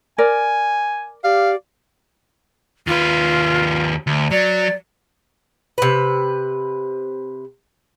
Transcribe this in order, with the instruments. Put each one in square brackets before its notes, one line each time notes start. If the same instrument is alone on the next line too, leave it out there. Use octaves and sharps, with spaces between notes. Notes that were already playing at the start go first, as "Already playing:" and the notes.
[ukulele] A#4 D5 [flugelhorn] G#5
[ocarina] G4 [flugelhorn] D5 [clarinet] F5
[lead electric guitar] D#2 B4 [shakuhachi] F4
[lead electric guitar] D2
[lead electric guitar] F#3 [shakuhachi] D5
[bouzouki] C3 B4